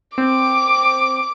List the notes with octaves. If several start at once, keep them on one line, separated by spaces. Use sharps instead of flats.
C4 D6